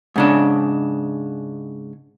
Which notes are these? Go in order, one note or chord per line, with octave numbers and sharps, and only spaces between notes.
G#2 C#3 D4